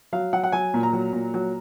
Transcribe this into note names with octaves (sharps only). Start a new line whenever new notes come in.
F#3 F5
F#3 F#5
F#5
F#3 G#5
A#2
A#5
F#3
A#2
F#3